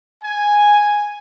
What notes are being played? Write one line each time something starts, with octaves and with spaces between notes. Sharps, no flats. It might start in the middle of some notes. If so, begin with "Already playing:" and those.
G#5